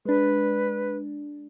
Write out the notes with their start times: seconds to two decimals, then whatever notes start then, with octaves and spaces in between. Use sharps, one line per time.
0.05 G#3 D4 B4